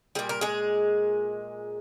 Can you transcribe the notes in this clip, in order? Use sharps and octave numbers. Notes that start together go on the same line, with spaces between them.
A#2 G3 G#4
A#4
G#3 G#4